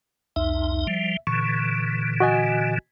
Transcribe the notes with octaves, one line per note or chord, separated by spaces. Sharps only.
C2 F2 D#4 E5
F3 G3
A#2 D3 E3 C#6
F#4 D#5 G#5